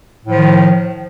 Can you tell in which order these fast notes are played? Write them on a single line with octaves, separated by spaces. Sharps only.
A2 F3 D#3